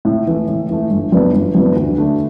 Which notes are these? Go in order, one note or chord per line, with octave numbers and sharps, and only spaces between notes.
A2
E3 A3
A2
E3 A3
G1
F#2 E3 B3 D4
G1
F#2 E3 B3 D4
D2
D3 A3